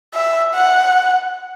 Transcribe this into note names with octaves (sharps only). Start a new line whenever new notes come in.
E5
F#5